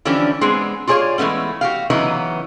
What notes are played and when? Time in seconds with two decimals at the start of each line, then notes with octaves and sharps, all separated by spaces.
0.05 D3 E3 F3 G3 C#4 D4
0.41 G#3 B3 C4 D4 G#4
0.87 F4 G4 G#4 C#5 D5 F5
1.18 E3 G#3 A3 B3 C#4
1.61 F#4 G4 F5
1.90 C#3 E3 F#3 B3 D#4